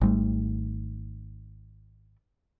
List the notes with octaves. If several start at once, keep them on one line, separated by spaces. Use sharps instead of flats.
G#1 G3 A3